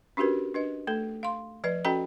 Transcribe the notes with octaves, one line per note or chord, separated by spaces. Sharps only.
C#4 D4 F#4 G4 A#4 B4
D4 B4 D#5
A3 A4
F5 C6
F3 B4 D5
C#4 F#4 A4 D#5 G5 A#5